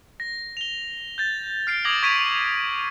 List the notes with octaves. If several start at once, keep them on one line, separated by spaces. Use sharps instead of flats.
A#6
F7 G7
G6 A6
F6 C7 D7
D6 D#6 G#6 A#6 D7 F#7
C#6 G#6 B6 D7 D#7 F7